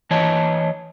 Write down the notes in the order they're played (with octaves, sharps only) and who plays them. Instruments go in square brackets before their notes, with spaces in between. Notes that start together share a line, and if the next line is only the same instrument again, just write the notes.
[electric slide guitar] E3 C#5 D#5 A5